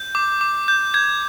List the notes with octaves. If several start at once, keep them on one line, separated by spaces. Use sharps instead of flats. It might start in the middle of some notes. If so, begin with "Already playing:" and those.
Already playing: G6
D6
D6
G6
G6 G#6